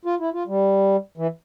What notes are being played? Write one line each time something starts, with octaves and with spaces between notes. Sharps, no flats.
F4
E4
F4
G3
E3